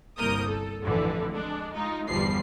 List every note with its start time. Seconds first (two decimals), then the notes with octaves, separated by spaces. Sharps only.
0.18 G1 C2 A#3 A#4 D#6 G6
0.47 A4
0.82 A1 F2 D3 E3
1.32 G#3 D4
1.75 G#3 D#4 F4
2.09 G1 E2 F3 G3 C7